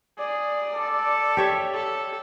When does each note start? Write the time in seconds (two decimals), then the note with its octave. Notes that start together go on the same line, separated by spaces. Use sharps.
0.18 G#4 D5
0.75 A4
1.37 G4 C#5 E5
1.74 A4